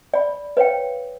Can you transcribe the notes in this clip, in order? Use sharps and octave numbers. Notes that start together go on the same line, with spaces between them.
D5 B5
B4 C#5 F5 G5